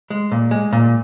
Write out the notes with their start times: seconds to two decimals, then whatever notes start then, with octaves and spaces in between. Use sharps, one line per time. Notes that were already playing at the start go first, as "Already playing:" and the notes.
0.10 G#3
0.31 A#2
0.51 G#3
0.73 A#2